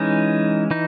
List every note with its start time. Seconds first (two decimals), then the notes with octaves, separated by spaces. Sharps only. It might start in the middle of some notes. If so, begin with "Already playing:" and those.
Already playing: E3 G#3 C#4 D#4
0.71 E3 D#4